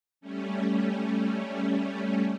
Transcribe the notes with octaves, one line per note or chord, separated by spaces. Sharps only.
G3 A3 C#4